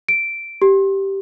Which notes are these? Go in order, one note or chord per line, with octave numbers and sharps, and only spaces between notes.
D7
G4